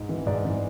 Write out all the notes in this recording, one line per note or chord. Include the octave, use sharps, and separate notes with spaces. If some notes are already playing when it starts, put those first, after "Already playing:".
Already playing: G#2
E3
G#2 D5
E3